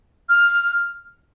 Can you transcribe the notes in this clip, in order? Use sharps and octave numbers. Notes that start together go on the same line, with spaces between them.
F6